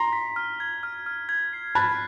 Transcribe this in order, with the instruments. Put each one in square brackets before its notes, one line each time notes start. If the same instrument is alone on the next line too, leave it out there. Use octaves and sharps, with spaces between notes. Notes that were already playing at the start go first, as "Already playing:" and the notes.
Already playing: [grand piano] A#5 C6
[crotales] B6
F6
G#6
F6
F6
G#6
C7
[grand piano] A5 B5 [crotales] F#6